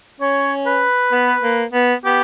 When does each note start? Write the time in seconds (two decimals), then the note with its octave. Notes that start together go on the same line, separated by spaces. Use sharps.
0.20 C#4 C#5
0.66 B4
1.12 B3
1.43 A#3
1.73 B3
2.04 B3 G4